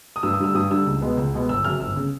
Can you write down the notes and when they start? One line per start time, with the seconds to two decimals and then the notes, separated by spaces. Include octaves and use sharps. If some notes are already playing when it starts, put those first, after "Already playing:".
0.16 D#6
0.23 G2 E6
0.34 D#6
0.40 D3 G3 E6
0.55 G2 D#6
0.70 D3 G3 E6
0.86 C#2
1.01 B2 G#3 B3
1.17 C#2
1.33 B2 G#3 B3
1.49 G1 E6
1.64 F#2 C#3 F6
1.80 G1 E6
1.96 C#3